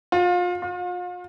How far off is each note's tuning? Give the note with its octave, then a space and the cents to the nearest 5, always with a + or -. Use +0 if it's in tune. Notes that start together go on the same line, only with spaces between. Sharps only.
F4 +30
F4 +40